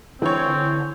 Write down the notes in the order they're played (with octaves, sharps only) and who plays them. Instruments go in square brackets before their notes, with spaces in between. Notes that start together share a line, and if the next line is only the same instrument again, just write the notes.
[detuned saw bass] D3 [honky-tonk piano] E3 C#5 [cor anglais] C4